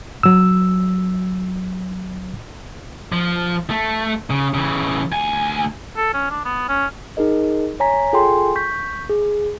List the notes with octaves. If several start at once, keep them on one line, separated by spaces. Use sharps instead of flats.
F#3 E6
F3
A3
C#3
C#3 E3
D2 G#5
A4
C#4
D4
B3
C#4
D#4 G#4 A#4 D#5
C#5 G#5 A#5 B6
F4 G#4 A4 G5 G#5 C6
C#6 G6 B6
G#4